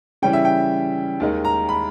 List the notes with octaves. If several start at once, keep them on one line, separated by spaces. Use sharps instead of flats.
C#3 E3 G3 C#4 E4 G5
E5
G5
D#2 D#3 G#3 D#4
A#5
B5